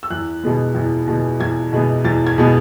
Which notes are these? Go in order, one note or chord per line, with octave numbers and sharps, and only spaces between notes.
E6
E2 F#6
B2 G#3 B3
E2
B2 G#3 B3
E2 G#6
B2 G#3 B3
E2 A6
G#6
B2 G#3 B3